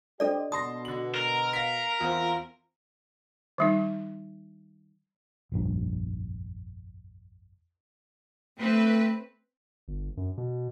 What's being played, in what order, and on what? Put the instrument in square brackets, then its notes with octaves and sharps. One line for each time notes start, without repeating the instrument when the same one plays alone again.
[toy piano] D4 A4 D5 [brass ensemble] G4 C5 D#5
[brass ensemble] B2 [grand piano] A5 C6 A#6 [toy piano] D#6
[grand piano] D3 F#7
[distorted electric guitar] A#4
[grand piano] F5 A#6 B6
[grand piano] E2 C4 [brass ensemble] F4
[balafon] D#3 G3 D#4
[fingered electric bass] F1 A#1 G2
[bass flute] A3 [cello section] C4 B4
[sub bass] G1
F#2
B2